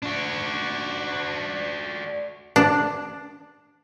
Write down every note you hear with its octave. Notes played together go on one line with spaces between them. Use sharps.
D4 F#4
D4